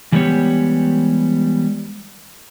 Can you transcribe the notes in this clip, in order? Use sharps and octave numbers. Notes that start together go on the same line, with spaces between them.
E3 G3 G#3 B3 G4 C#5